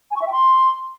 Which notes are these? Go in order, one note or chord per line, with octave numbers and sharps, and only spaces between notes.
G#5
C#6
E5
G5
C6